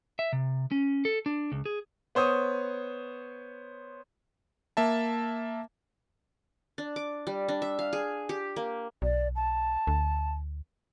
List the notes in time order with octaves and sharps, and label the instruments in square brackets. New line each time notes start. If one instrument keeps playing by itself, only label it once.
[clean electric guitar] E5
C3
C#4
A4
D4
C#2
G#4
[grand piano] B3 C5 C#5 D#6
[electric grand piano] A#3 E5 A5
[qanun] D4
D6
G3
D4
E5
F5
G#4
G4
A#3
[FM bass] B1 [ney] D5
[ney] A5
[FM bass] D2